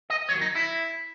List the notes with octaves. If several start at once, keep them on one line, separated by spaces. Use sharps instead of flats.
D#5
D#2 C#3 F#3 C#5
D#4
E4